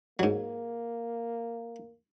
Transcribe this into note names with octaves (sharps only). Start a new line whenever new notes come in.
G#2 F#3 A#3